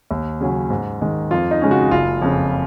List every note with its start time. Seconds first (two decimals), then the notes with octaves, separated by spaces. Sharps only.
0.11 D#2
0.41 C#3 F#3 C#4
0.70 G#2
1.01 D#3 G#3
1.31 F2 F4
1.51 D#4
1.61 C#3 G#3 C#4
1.71 F#4
1.91 F#1 F4
2.22 F2 C#3